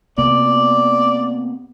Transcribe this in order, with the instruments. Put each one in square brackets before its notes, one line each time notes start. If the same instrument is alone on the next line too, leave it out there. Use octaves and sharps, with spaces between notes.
[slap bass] C3 A#3 B3 [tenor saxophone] D5